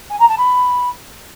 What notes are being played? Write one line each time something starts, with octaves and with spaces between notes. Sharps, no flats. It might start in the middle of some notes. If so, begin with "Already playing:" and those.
G#5
A#5
A5
B5